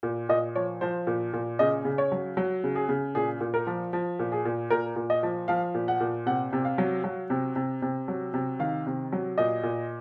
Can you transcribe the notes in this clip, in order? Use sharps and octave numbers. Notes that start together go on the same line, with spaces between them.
A#2
A#2 D#5
F3 C#5
F3 C5
A#2
A#2
C#3 D#5
C#3
C#5
F#3
F#3
C#3
G#4
C#3
A#2 G#4
A#2
A#4
F3
F3
A#2
G#4
A#2
A#2 A#4
A#2
D#5
F3
F3 F5
A#2
F#5
A#2
C3 F#5
C3
F5
F#3
F#3
C3
C3
C3
F#3
C3
D#3 F5
C3
F#3
A#2 D#5
A#2